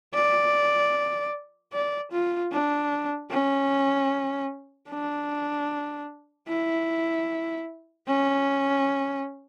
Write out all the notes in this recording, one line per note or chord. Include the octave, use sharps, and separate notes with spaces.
D5
D5
F4
D4
C#4
D4
E4
C#4